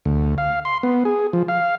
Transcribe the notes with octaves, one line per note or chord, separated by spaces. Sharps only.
D2
F5
C6
B3
G#4
F3
F5